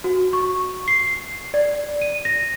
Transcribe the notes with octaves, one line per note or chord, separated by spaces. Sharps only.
F#4
C#6
C7
D5
D#7
A#6